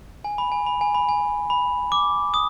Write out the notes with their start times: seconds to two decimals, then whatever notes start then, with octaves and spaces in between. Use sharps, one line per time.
0.24 G#5
0.38 B5
0.52 G#5
0.66 B5
0.81 G#5
0.95 B5
1.09 G#5
1.50 B5
1.92 D6
2.34 D#6